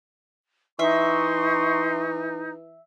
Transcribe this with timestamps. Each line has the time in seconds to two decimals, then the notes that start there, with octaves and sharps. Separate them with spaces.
0.79 E3 D#4 E5 C6 C#6